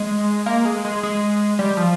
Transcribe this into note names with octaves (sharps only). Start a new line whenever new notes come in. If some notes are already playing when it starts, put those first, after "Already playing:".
Already playing: G#3
A#3
G#3
G#3
G#3
G3
F3